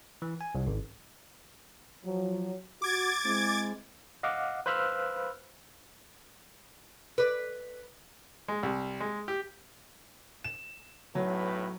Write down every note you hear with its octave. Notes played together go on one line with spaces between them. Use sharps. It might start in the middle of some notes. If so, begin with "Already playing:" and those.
E3
G#5
C2
G#1
F3 F#3
F#4 D6 G#6 A6
G#3 C4 E4
D#5 F5 F#5 D6
B4 C5 F5 B5 E6 F6
B4 D5
G#3
C2
G#3
G4
E7
B1 A2 F#3 B4